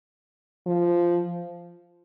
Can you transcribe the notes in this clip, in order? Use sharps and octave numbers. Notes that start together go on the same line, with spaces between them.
F3